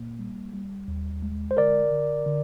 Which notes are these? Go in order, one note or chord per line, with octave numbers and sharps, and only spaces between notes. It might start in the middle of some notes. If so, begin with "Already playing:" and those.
Already playing: A#2 A#3
G3
G3
D#2
G#3
C5
D3 A#4 D5
D3
D3